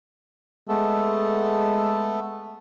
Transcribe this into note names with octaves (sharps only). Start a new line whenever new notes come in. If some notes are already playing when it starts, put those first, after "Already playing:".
G#3 A3 B3 A4